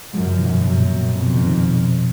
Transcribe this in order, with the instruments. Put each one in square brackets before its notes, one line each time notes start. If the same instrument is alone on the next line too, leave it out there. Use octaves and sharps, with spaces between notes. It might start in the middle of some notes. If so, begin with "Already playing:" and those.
[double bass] F#2 [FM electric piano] F3 G#3
[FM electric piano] C#3 F3
B2 D#3
A#2 C#3
[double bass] F#2 [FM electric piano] A#2 C#3
[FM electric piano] A#2
B2
[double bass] F2 [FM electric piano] A#2
[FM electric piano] B2
A#2 C#3
B2 D#3